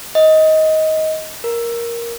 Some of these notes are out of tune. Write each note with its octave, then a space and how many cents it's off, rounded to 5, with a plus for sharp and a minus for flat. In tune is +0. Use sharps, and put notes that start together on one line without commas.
D#5 +15
A#4 +5